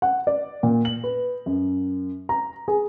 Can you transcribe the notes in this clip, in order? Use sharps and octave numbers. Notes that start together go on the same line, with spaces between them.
F#5
D5
A#2
F#7
B4
F#2
A#5
G#4